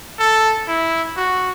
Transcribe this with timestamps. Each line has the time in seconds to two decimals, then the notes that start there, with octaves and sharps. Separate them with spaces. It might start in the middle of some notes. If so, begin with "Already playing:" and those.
0.19 A4
0.68 E4
1.17 F#4